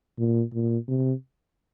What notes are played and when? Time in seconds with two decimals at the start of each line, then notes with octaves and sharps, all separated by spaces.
0.18 A#2
0.54 A#2
0.88 C3